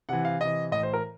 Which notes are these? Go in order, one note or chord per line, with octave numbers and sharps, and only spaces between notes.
C3 E3 F#5
F5
C3 E3 D#5
A2 E3 D#5
C5
A#4